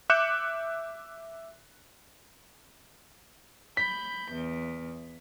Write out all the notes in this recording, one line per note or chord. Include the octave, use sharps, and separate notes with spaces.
E5 D6 F#6 G6 C#7 E7
B5 G6 B6
E2